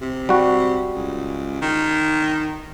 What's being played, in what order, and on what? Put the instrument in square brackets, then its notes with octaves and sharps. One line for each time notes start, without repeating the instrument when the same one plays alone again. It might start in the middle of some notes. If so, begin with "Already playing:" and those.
[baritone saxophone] C3
[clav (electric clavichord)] G3 F#4
[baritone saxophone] C#2
D#3